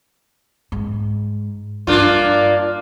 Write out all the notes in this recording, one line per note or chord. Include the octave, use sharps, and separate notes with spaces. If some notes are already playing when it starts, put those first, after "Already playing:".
G#2
G2 A#3 D4 F4